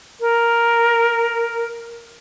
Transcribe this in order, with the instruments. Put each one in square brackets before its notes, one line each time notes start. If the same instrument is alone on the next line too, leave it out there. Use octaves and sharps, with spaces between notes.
[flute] A#4